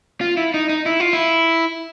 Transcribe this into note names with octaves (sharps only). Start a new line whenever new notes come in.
F4
E4
D#4
D#4
E4
F4
E4